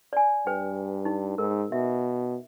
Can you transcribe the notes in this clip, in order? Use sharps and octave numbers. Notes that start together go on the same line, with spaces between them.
D5 G#5
G2 B4 G5
D#4
G#2 A#4
B2 E5